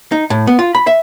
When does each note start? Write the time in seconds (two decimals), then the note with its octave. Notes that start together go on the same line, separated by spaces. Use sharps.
0.12 D#4
0.30 A2
0.47 B3
0.59 F4
0.75 B5
0.87 E5